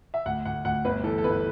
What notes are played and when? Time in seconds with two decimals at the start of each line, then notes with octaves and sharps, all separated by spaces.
0.14 E5
0.26 D2 F#5
0.45 D2 F#5
0.65 D2 F#5
0.85 G1 B4
1.04 E3 A4
1.18 A4
1.24 G1 B4